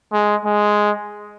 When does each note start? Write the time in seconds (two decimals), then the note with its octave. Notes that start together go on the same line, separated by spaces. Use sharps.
0.13 G#3
0.45 G#3